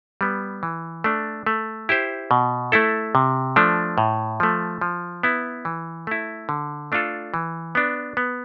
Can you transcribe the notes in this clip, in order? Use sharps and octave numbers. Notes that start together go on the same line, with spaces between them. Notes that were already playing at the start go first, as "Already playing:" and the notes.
G3 B3
E3
A3 D4
A3
E4 G4 C5
B2
A3 E4 A4
C3
F3 A3 D4
A2
F3 A3
F3
B3 E4
E3
A3 E4
D3
A3 D4 F4 A4
E3
B3 D4
B3